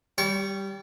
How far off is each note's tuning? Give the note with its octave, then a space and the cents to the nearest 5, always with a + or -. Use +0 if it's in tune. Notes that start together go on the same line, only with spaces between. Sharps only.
G3 +0 D5 -45 C#6 +0